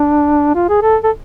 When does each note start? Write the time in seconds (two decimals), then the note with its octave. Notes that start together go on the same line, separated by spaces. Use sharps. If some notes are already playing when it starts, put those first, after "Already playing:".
Already playing: D4
0.55 F4
0.69 G#4
0.82 A4
1.04 A4